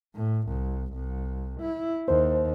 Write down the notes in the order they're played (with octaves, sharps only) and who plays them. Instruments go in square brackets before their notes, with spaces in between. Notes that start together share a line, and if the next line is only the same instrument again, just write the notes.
[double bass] A2
C2
C2
E4
[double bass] D#2 [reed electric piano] C5